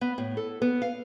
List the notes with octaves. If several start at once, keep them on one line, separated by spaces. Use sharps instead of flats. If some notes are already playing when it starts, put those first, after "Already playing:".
B3
A2
A4
B3
F5